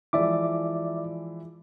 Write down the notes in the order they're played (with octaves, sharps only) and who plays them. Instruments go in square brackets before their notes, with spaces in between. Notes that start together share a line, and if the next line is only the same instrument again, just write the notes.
[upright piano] E3 F3 G#3 [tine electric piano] D5 E5 D6